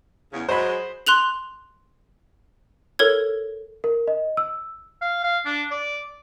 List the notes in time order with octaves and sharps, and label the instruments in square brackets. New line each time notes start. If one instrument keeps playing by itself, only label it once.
[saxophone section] E2 C#3
[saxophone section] F#3 G#3 [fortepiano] C5 B5
[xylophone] C6 F#6 F7 F#7
A4 A#4 C#5 G#6
[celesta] A#4
D#5
E6
[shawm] F5
F5
D4
D5